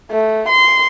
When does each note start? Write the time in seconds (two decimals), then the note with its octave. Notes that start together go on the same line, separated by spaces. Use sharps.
0.11 A3
0.49 C6